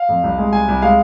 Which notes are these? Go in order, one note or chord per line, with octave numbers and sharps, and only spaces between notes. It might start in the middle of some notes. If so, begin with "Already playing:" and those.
Already playing: F5
F2
C2
G#3
C2 G#5
C2
G#3 F5